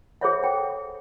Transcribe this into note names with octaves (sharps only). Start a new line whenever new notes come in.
G#4 A4 C5 C#5 E5 F#5
F#5 G5